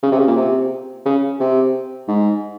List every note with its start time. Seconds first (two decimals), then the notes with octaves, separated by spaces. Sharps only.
0.03 C#3
0.12 C3
0.19 C#3
0.27 A#2
0.37 C3
1.06 C#3
1.40 C3
2.08 G#2